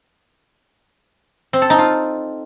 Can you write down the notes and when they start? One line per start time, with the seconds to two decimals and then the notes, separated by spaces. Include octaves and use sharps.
1.53 C4
1.62 A4
1.70 D#4
1.78 F4